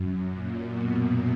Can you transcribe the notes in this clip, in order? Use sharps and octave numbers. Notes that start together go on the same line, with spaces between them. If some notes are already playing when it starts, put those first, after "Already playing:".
Already playing: F#2
A#2
B2